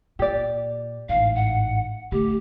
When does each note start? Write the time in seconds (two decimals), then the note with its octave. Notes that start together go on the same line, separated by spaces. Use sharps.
0.19 A#2 G4 D5
1.09 A1 G#2 F5
1.35 F#5
2.12 D3 A3 G4